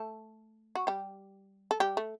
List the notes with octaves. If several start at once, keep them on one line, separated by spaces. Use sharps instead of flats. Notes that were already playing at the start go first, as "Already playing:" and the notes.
Already playing: A3 A4
F#4
G3 G4
A4
G3 G4
A3